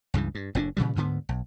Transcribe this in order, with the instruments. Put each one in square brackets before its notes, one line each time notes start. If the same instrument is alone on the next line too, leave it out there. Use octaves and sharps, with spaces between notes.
[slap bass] C#2 G2 C#3 E3
G2
F#1 A2 C4 D4
A#2 C#3 E3 G3
D2 G#2 D3 B3
B1